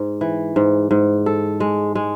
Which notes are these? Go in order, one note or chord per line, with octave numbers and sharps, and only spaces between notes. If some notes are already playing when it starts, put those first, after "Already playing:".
Already playing: G#2
E3
G#2
G#2
A4
G#3
G#3